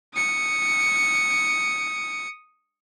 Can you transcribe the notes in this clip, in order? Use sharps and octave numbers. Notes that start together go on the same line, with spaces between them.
D#6 C#7